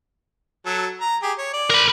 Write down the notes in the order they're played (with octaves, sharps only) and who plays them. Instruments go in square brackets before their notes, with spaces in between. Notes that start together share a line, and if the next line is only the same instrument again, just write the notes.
[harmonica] F#3 A4
A#5
G4 G#4
C#5
D5
[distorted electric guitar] A#4 B5